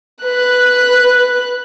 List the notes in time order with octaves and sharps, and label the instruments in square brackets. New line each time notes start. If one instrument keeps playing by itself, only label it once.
[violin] B4 F#6